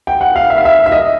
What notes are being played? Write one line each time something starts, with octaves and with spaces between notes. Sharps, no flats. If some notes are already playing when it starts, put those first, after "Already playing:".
G5
F#5
F5
E5
F5
E5
E5
D#5